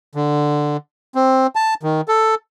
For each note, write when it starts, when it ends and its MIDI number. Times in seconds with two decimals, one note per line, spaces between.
0.15 0.77 50
1.15 1.47 60
1.55 1.74 81
1.83 2.01 51
2.08 2.35 69